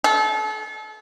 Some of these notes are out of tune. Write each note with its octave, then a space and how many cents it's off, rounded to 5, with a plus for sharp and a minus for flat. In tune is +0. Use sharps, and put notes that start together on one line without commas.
A4 -35